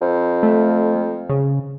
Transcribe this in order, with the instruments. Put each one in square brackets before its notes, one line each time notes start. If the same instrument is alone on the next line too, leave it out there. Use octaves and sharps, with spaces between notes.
[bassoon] F2
[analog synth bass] A3
C#3